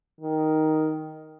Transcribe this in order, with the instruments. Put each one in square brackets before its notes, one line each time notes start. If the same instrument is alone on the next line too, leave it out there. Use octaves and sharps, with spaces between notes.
[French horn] D#3